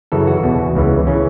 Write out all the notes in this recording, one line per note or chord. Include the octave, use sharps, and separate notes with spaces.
F#2 C#3 E3 A4
F#4
E2 B2
C#2 C#3 E3
C#3 E3 C#4